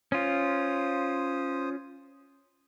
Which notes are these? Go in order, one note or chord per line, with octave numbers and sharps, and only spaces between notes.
C#4 F4 C5 D#6